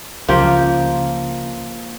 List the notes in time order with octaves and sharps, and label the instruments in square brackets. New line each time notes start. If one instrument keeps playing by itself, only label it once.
[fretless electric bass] C#2 [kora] F3 A#3 G4